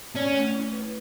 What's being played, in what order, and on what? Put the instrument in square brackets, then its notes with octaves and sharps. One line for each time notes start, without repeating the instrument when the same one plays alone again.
[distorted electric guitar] C#4 [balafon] D5
[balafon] A3
E4
B4